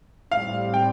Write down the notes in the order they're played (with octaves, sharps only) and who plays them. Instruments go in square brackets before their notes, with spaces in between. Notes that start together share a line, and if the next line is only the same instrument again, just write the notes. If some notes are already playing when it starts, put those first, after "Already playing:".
[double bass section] A2 G3 C4 [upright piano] F5
[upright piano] G5